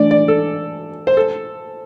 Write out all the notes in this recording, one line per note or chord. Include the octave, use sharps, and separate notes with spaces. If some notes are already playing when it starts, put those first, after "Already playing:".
Already playing: E3 A3 D4 D5
D5
A4
C5
A4